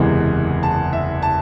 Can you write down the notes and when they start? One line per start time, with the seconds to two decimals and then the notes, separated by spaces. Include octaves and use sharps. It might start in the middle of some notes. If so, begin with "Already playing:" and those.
Already playing: F#1 E2 C3 E3 G#3
0.63 A5
0.93 E5
1.22 A5